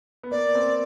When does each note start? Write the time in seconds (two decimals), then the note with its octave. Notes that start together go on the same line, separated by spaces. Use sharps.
0.23 B3
0.31 A#3 D5
0.55 C4